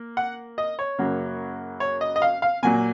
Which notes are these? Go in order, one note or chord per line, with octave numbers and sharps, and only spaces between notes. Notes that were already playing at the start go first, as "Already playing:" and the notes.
Already playing: A#3
F#5
D#5
C#5
F#2 C#3 F#3 A#3
C#5
D#5
D#5
F5
F5
A#2 F#3 A#3 G#5